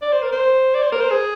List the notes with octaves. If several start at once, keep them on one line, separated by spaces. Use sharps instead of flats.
D5
C5
A#4
C5
D5
C5
A#4
C5
G#4